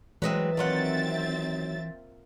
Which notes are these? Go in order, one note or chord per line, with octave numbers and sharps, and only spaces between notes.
E3 F#3 G#3 C4 B4 D#5 E5
D#3 F#3 A#3 C4 F4 E5 F#5 A6